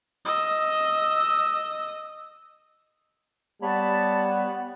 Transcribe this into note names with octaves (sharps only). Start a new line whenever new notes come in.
D#5 E6
G3 B3 C#5 A5 B5